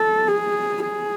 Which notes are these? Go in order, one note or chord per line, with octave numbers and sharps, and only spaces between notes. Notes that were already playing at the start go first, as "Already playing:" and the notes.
Already playing: A4
G#4
G#4